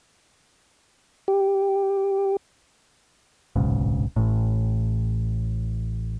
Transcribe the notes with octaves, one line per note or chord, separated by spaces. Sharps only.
G4
D1 B1 G#2 C#3
A1 A2